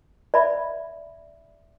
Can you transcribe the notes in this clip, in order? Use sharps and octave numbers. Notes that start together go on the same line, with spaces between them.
D5 E5 B5